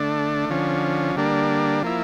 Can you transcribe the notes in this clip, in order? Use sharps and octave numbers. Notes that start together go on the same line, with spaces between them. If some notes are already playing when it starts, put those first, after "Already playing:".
Already playing: D3 A3 D4
D3 F3 C#4
D3 G3 A#3 D4
F3 A#3 E4